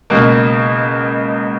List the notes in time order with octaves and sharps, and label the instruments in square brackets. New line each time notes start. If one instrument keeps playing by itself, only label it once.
[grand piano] C#2 B2 A#3